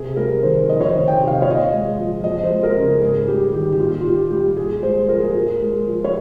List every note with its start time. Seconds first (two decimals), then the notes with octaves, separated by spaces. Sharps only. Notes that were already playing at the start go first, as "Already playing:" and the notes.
Already playing: C3 G#4
0.16 G3 A#4
0.43 D#3 C5
0.69 F2 D#5
0.81 C#5
0.89 C5
0.95 D#3
1.08 G5
1.20 C3
1.27 F5
1.35 D#5
1.42 C#5
1.46 A#2 D#5
1.72 G#3
1.99 F3
2.23 F2 D#5
2.43 C5
2.50 G#3
2.63 A#4
2.76 C#3
2.82 G#4
3.01 G#2 G#4
3.27 G3 G4
3.53 D#3 G4
3.72 G4
3.79 A#2 F4
4.01 F4
4.05 A#2 G4
4.30 G3 G4
4.57 A#2 G#4
4.83 G#3 C5
5.09 F3 A#4
5.20 G#4
5.31 A#2 A#4
5.60 G#3
5.87 F3
6.04 C#5